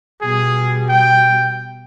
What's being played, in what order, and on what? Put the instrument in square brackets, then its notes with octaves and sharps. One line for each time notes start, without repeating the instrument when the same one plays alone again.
[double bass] B2 G3 [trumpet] G#4
[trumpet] G5